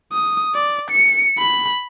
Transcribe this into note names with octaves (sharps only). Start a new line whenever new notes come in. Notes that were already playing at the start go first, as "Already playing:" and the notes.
D#6
D5
C#7
B5